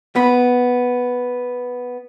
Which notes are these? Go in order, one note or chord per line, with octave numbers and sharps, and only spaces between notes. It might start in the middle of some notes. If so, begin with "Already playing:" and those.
B3 B5